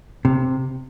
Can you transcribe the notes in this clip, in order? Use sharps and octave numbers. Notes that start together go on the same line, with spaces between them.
C3